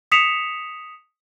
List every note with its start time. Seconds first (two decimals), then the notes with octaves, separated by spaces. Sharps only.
0.12 D#6 B6 C#7 E7 F7